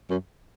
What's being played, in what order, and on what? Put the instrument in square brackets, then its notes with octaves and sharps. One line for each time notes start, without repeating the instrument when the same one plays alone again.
[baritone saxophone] F#2